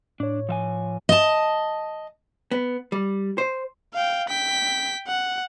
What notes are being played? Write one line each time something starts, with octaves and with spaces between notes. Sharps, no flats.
A2 D4 C#5
F3 E5 G#5
D#5 A5
B3
G3
C5
F5 G5
G5 B6
F#5